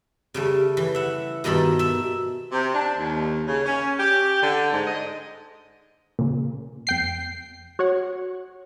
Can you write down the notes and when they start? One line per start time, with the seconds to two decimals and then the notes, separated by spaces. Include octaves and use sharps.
0.34 C#3 G3 A3
0.77 E3
0.95 E5 F#5
1.44 G2 B2 D#3 A4 B5
1.79 E5
2.52 C3
2.74 D4
2.97 D#2
3.47 C#3
3.65 C#4
3.99 G4
4.41 D3
4.72 G#2
4.86 D#5
6.19 A#2 C#3
6.87 F2 G5 C7
7.79 F#4 C#5 F#5